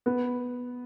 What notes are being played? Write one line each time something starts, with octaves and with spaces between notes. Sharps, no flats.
B3